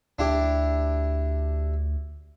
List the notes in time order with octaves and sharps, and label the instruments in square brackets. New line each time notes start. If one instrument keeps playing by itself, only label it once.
[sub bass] D2 [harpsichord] D4 E4 G4